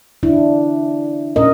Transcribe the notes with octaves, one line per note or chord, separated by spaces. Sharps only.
D4 E4
A#2 C#4 A#4 D#5